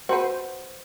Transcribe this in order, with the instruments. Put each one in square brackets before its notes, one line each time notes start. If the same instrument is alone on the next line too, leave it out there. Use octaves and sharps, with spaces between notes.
[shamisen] F#4 B4 [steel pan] C5